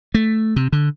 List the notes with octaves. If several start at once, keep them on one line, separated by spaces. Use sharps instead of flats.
A3
C3
D3